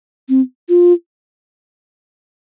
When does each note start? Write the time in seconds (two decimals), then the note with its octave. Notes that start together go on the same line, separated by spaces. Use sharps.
0.29 C4
0.69 F4